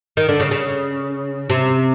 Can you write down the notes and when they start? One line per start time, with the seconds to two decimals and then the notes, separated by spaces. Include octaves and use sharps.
0.17 D#3
0.29 D3
0.40 C#3
0.51 C#3
1.50 C3